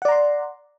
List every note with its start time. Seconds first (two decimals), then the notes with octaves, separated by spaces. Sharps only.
0.02 F#5
0.05 D5
0.08 A#5
0.12 C6